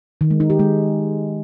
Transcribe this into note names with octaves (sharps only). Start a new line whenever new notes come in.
D#3
G#3
D#4
G4
G#3